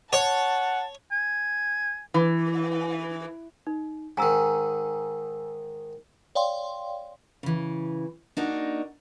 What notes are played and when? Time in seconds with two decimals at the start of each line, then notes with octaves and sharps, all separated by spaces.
0.13 C#5 F#5 A5
1.11 G#5
2.14 E3
3.67 D#4
4.17 G#2 D#3 G#5 A#5 E6
6.35 C#5 D5 F5 G5 C6
7.43 C#3 E3
8.37 A#3 D4 D#4 F#4